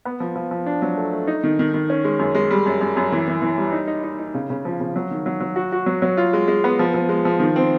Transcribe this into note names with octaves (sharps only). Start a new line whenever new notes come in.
B3
F3
F3
F3
D4
F#3
A3
A3
D#4
D#3
D#3
D#3
C#4
G#3
F#2
G#3
G3
F#2
F#2
F#2
E3
E3
E3
G3
D#4
D#4
D#4
D#4
C#3
C#3
F3
C#3
F#3
D#3
F#3
F#3
F#4
F#4
F#3
F#3
F4
G#3
G#3
B3
F3
F3
G#3
F3
D#3
C4